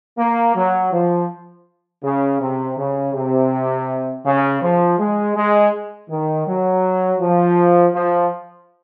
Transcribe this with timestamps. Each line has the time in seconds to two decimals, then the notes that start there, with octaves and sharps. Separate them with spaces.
0.18 A#3
0.55 F#3
0.92 F3
2.04 C#3
2.40 C3
2.77 C#3
3.14 C3
4.25 C#3
4.61 F3
4.99 G#3
5.36 G#3
6.10 D#3
6.47 F#3
7.20 F3
7.94 F3